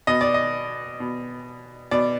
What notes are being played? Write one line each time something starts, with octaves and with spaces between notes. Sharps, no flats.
B2 D#5
D5
D#5
B2
B2 D5